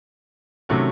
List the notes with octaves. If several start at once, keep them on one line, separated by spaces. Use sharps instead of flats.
C3 D#3 F#3 A3 C#4